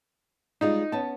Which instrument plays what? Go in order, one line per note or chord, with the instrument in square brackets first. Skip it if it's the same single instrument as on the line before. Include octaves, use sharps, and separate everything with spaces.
[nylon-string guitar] G3 G#3 F4 [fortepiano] D#4
[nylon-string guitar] B3 C#4 [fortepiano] A5